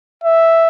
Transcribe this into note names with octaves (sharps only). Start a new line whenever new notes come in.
E5